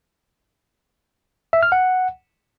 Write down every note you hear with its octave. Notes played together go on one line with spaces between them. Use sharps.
E5
F6
F#5